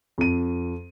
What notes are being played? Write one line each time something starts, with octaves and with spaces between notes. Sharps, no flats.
F2 D#7